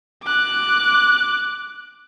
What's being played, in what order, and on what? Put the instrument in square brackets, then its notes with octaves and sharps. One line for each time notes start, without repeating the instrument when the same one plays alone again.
[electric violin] D6 F#6